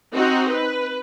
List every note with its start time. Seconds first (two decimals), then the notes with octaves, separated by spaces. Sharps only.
0.14 C4 D#4 F#4
0.51 B4